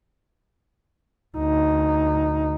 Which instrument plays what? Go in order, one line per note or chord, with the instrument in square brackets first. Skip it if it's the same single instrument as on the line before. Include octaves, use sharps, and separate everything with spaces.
[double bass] D2 D#4